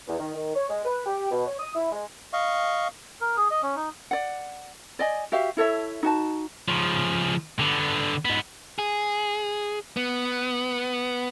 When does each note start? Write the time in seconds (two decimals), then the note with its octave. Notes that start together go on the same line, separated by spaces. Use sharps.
0.08 E2
0.19 D#3
0.34 D#3
0.56 C#5
0.70 G#3
0.85 B4
1.06 G4
1.31 B2
1.47 C#5
1.59 D#6
1.75 E4
1.92 G#3
2.33 D#5 F5 C#6
3.21 A#4
3.37 G#4
3.51 D#5
3.63 C#4
3.76 D#4
4.11 D5 F#5
4.99 D5 D#5 G#5
5.32 F#4 G4 E5 F5
5.57 E4 A4 C#5 E5
6.03 D#4 F#4 A5
6.69 C#3 F3
7.59 D3 B3
8.25 G#2 B3
8.79 G#4
9.97 B3